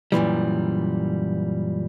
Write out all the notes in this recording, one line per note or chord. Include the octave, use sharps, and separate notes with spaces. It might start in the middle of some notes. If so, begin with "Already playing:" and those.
F#2 A#2 E3 G3